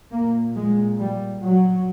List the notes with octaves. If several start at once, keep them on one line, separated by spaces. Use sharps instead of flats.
A#2 A#3
G#3
G3
F#3